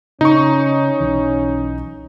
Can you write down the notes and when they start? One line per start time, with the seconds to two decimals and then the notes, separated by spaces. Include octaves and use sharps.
0.21 C#3 C#4 D#4 C#6
1.00 B1 E3